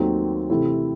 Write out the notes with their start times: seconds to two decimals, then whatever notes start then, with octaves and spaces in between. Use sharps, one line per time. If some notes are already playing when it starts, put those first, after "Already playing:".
Already playing: D#2 D#3 F#3 A3 C4
0.50 C3 E3 A3 C4 E4